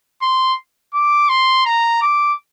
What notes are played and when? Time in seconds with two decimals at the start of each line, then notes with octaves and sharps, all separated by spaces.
0.22 C6
0.94 D6
1.29 C6
1.66 A#5
2.02 D6